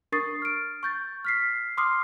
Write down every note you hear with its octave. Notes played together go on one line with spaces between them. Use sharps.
D4 A#4 C#6 D#6 A6 C7
F6 D7
C#6 G6 A6
F6 B6 C7
C6 D6 D#6 F6 C7